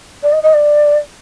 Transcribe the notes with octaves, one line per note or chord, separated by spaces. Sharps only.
D5
D#5
D#5
D5